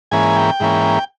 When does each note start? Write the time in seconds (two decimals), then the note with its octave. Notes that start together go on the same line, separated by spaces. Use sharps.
0.11 G#2 E3 A#3 C#4 G#5
0.36 G5
0.60 G#2 E3 A#3 C#4